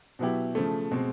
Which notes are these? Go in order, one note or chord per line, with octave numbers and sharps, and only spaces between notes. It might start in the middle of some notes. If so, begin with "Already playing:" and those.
B2 F#3 B3 E4 G4
C#3 F3 A3
B2 G#3 C4